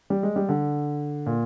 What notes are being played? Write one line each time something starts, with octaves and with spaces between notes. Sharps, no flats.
G3
G#3
G3
D3
A#2